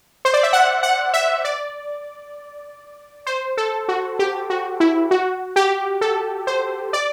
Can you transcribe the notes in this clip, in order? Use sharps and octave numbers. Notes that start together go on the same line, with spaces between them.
C5
D5
E5
F#5
F#5
E5
D5
C5
A4
F#4
G4
F#4
E4
F#4
G4
A4
C5
D5